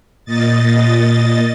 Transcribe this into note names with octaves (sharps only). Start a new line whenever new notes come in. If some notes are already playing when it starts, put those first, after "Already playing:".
A#2 D#5 A6